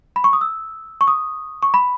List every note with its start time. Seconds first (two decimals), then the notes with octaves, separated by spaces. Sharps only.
0.16 B5
0.24 C#6
0.33 D#6
0.41 E6
1.01 C#6
1.08 D#6
1.63 C#6
1.74 B5